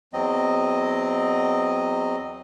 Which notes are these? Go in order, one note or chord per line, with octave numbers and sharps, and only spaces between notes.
E2 F#3 C4 D#5